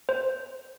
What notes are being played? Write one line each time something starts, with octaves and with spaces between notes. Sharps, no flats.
C5